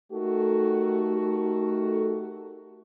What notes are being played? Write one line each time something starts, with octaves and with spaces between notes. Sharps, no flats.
A3 D#4 F#4 G4 A4 A#4